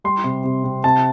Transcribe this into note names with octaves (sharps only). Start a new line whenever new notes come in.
G3 C6
C3
C3
C3
C3 A5